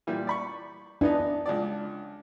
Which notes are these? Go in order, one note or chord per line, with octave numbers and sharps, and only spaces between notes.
A#2 E3 G3
D5 B5 C#6
E3 B3 D4 D#4
C#2 F3 D5